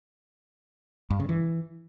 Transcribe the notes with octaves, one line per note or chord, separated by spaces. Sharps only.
G2
C#3
E3